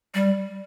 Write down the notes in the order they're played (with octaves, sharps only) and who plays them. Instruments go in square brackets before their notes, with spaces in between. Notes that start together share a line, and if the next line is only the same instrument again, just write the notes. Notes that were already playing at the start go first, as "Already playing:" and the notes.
[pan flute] G3